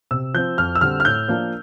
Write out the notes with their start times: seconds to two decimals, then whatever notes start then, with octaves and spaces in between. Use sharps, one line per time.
0.11 C3 E6
0.34 F3 C4 G6
0.58 F2 F6
0.75 E6
0.81 D3 G3 C4 F6
1.00 F6
1.05 A2 G6
1.28 F3 A#3 D4